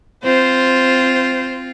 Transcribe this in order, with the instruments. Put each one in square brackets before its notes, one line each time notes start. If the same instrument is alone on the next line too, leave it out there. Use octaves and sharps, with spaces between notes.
[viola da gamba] C4 F4 [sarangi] C5